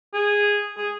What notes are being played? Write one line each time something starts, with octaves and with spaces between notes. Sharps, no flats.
G#4
G#4